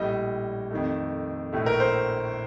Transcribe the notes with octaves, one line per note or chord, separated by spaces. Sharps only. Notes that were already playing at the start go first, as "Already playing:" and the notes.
Already playing: A#1 A2 G3 D#5
F2 D#3 A3
A#1 A2 A3
A#4
C5